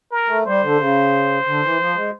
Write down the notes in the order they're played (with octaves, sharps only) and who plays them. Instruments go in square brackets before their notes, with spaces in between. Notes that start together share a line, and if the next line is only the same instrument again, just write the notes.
[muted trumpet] A#4
[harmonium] A3
[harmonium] G3 [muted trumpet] C5
[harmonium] D3
C#3
D3
E3
F3
G#3